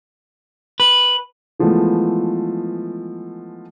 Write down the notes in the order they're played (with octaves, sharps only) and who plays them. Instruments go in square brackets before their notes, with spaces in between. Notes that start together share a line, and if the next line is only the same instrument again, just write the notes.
[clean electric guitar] B4
[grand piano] E3 F3 G#3 A3 B3 E4